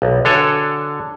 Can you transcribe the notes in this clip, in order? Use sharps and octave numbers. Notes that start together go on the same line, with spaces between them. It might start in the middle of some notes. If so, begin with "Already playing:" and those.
B1
D3 D4 F#4 A4 C#5 G#5